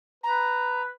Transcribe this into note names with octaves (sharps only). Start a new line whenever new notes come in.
B4 A#5